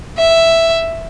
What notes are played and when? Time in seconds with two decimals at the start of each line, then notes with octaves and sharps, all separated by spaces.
0.18 E5